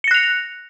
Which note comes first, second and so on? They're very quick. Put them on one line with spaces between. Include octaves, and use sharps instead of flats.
C#7 A#6 F#6 F7